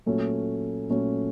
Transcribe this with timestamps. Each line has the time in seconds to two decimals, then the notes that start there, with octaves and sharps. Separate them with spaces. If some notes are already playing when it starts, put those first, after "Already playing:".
0.06 A#2 F#3 A3 C#4
0.89 A#2 F#3 A3 C#4